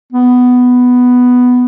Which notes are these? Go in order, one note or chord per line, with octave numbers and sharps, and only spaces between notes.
B3